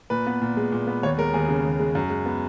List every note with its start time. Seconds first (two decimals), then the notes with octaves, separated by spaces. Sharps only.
0.10 A#2 B4
0.27 B3
0.42 A#2
0.57 G#3
0.72 A#2
0.87 B3
1.03 D#2 C#5
1.18 G#3 A#4
1.34 D#2 G#4
1.48 C#3
1.65 D#2
1.79 G#3
1.95 F#2
2.10 G#3
2.26 B3